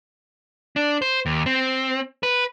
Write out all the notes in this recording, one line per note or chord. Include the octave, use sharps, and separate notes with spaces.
D4
C5
D#2
C4
B4